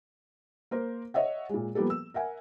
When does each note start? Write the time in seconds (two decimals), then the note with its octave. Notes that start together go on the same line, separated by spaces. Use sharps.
0.71 A#3 A#4 C5
1.14 C#5 D#5 E5 F#5
1.49 A#2 G#3
1.75 F3 G3 A#3 B3 G4 A4
1.90 E6
2.14 A#4 E5 F#5 G#5